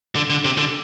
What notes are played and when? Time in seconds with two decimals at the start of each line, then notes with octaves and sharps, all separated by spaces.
0.16 D3
0.30 D3
0.45 C3
0.58 D3